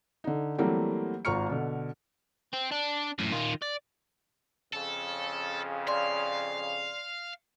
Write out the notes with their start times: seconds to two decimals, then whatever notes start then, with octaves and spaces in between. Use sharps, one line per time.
0.24 D3 D#4
0.58 E3 F#3 G3 A3 A#3 C4
1.25 G#1 F4 A#5 C#6 F6 C#7
1.49 B2 D3
2.53 C4
2.71 D4
3.19 F#2 A2
3.32 D#3 F4
3.62 D5
4.73 F2 C#3 A4
5.88 D5 F5 C6